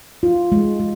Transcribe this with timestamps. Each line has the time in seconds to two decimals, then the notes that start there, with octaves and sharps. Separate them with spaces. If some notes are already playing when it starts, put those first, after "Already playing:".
0.23 F4
0.52 G#3
0.79 G#3